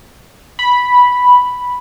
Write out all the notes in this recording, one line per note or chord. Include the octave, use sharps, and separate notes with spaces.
B5